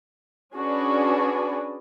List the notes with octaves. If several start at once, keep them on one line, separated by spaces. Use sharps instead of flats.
C#4 D4 F#4 G#4 B4 D5